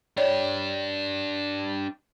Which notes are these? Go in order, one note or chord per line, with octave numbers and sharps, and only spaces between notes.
D4 G4 C#5 D5